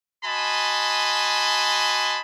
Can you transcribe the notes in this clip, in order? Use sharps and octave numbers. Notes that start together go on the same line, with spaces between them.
F#4 D#5 G#5 A5 B5 C6